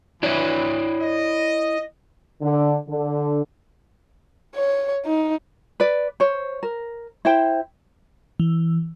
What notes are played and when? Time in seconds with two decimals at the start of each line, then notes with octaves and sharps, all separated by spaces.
0.23 E3 E4 C#5 D5
1.01 D#5
2.41 D3
2.88 D3
4.56 C#5
5.05 D#4
5.80 B4 D5
6.20 C5 C#5
6.63 A#4
7.25 E4 C5 G5
8.40 E3